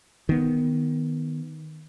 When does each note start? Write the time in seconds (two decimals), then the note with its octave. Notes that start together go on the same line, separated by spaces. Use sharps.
0.29 D#3 B3